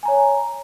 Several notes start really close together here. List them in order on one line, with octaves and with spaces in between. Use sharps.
G#5 A#5 C#5